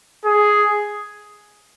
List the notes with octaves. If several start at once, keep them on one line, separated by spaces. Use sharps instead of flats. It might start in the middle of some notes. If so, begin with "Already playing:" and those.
G#4